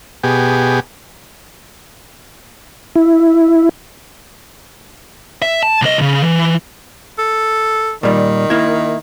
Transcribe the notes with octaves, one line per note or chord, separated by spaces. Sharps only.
B2 G4 G#4
E4
E5
A5
C2 D#5
C#3
E3
A4
A#2 D#3 G3
A#3 E4